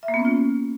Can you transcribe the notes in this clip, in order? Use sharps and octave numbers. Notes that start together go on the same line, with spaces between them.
E5
A#3
B3
C#4
F4